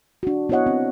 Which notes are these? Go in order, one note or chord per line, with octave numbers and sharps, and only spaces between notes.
D4 F#4
B3 E4 F#4 C#5 D#5 F#5
C4